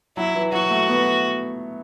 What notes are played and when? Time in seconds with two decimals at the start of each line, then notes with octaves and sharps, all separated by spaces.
0.17 F#3 E4
0.35 E3
0.52 F#3 F#4
0.70 A3
0.88 B3